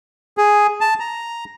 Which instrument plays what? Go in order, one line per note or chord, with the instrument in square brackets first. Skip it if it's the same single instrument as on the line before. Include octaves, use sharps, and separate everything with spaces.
[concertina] G#4
A5
A#5